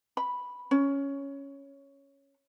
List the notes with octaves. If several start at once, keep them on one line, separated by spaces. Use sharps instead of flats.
B5
C#4